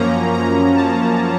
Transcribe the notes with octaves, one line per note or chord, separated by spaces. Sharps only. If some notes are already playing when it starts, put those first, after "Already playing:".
Already playing: F#2 F3 A#3 C#4 A#5
A#5
A5